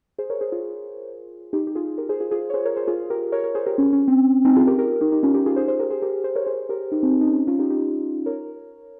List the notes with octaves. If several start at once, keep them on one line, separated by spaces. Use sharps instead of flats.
G#4 C5
A#4 C#5
G#4 C5
F4 G#4
D#4 G4
G4
F4 G#4
G4 A#4
G#4 C5
F4 G#4
F4 G#4
C#5
G#4 C5
A#4 C#5
G#4 C5
F4 G#4
G4 A#4
A#4 C#5
A#4 C#5
G#4 C5
G4 A#4
C#4
C#4
C4
C4 D#4
F4 G#4
G4 A#4
G4 A#4
D#4 G4
D#4 G4
C#4 F4
D#4 G4
F4 G#4
G#4 C5
G#4 C5
G4 A#4
G#4 C5
G4 A#4
G#4 C5
A#4 C#5
G#4 C5
G4 A#4
D#4 G4
C4 D#4
D#4
C#4
C#4
C#4 F4
D#4 G4
D#4 G4
A#4 C#5